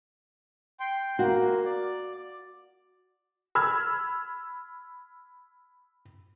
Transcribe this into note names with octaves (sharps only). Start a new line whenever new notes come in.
G5 C6
A#3 F#4
D5
B5 E6 F6 G#6